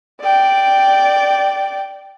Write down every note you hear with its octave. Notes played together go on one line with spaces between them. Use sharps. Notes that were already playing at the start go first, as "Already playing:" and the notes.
D5 G5